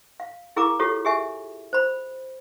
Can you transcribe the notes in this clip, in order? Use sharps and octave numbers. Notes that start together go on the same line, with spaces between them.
F5
E4 G#4 A#4 F5 A#5 D6
F4 G4 A4 C#5
G4 G#4 E5 G#5
C5 B5